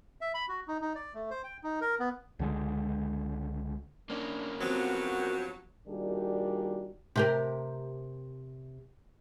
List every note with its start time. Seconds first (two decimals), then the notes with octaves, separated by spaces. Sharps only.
0.21 E5
0.34 B5
0.49 F#4
0.68 D#4
0.81 D#4
0.95 D5
1.14 A3
1.30 C5
1.44 G5
1.63 D#4
1.81 A#4
2.00 B3
2.39 C#2 D3 G#3
4.10 A#3 C#4 D4
4.61 G2 F3 F#3 B3 C4 F#4
5.87 A#2 D#3 G3 D4 F#4 G#4
7.16 C3 G4 A#4